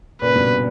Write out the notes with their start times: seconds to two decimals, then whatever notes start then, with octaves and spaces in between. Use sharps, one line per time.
0.22 A#2 C#3 B4
0.35 G2 B2